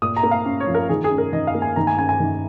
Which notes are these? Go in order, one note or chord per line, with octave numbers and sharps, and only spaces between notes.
A#2 D#6
A#5
A#3
F5
C#4
C#5
F3
A#4
D#3 G#4
G#4
C#4
A#4
D#3 D#5
F5
A#3
G#5
D#3 A#5
G#5
C#4 G#5
G#5
D#3